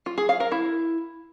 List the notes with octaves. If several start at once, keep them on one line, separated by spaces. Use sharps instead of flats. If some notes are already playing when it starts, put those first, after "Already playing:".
F4
G#4
F5
A#4
E4